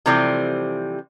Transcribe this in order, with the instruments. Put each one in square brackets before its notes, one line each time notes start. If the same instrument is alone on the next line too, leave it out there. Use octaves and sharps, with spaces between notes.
[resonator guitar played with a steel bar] C3 E3 F3 G3 A3 C4